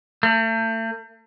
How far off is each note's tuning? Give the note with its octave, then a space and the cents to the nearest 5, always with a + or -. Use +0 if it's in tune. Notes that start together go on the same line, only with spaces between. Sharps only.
A3 +35